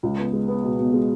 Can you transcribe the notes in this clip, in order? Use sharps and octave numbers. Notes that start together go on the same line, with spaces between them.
C#2
B3
G#3
B3
B2
B2
G#3